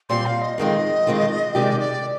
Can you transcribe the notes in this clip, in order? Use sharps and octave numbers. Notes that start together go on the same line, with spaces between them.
A#2 G3 C4 C6
F5
D#5
F2 D#3 G#3 C4 F4 D#5
F2 D#3 G#3 C4 F4
C3 D#3 G#3 D#4 G4 D5
D5